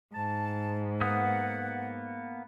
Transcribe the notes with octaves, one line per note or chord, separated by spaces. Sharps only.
G#2 A5
A#3 B3 F#5 D#6